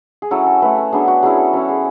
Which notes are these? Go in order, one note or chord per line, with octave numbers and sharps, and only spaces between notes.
G#4
F#3 C#4 E4 A4
A4
A3 E4 B4
A4
F#3 B3 D4 G#4
F#4
F#3 C#4 E4 G#4
A4
F#3 C#4 E4 A4
G#4